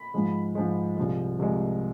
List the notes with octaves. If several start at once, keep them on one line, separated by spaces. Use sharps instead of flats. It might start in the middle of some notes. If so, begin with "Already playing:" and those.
Already playing: B5
G#2 F3 G#3
G#2 F3 G#3
C2 C3 F3 G#3
C2 C3 F3 G#3